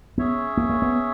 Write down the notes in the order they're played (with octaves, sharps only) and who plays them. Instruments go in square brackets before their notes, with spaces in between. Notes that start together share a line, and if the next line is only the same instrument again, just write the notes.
[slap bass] B3 [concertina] C#4 G#4 C#5 E5
[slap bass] A#3
A#3
B3